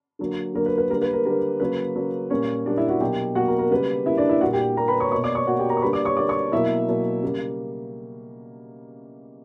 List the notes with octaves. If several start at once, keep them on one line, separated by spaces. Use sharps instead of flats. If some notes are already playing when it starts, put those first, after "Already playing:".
D3 F#3 A#3
D3 F#3 A#3 A#4
B4
B4
D3 G3 A#3 A#4
B4
A#4
D3 G3 A#3 A#4
C#3 F#3 A#3 B4
C#3 F#3 A#3
A#2 G3 A#3 C#4 C#5
A#2 G3 A#3 D4 D5
E4 E5
F#4 F#5
B2 F#3 A#3 G4 G5
B2 F#3 A#3 F#4 F#5
A#4
A#4
C#3 G3 A#3 B4
C#3 G3 A#3 E4 E5
D4 D5
E4 E5
A#2 G3 A#3 F#4 F#5
G4 G5
A#2 G3 A#3 A#4 A#5
B4 B5
C#5 C#6
B2 A#3 C#5 C#6
D5 D6
C#5 C#6
B2 A#3 F#4 F#5
G4 G5
A#4 A#5
C#6
D3 G3 A#3 B4 B5
D5 D6
C#5 C#6
D3 G3 A#3 D5 D6
C#5 C#6
B2 F#3 A#3 E4 E5
B2 F#3 A#3
C#3 G3 A#3